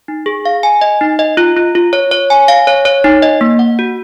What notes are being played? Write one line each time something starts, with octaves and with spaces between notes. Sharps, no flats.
D#4
G#4
F5
G#5
D#5
D#4
D#5
F4
F4
F4
C#5
C#5
G#5
F5
C#5
C#5
D#4
D#5
A#3
F#5
F#4